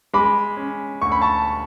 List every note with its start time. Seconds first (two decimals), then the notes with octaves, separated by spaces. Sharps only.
0.13 G#3 B5 D6
0.57 C#4
1.02 D2 C#6
1.12 B5
1.21 A5 C#6